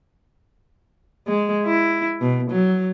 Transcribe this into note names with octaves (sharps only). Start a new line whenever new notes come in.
G#3
E4
B2
F#3